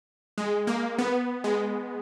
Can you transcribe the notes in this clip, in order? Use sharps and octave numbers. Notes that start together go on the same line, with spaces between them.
G#3
A#3
B3
G#3